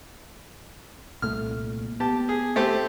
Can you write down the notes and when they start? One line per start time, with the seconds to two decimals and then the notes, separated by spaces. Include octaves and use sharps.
1.22 C2 A#2 A3 F6
2.00 B3 G4 A5
2.29 G#4
2.56 A3 C4 G4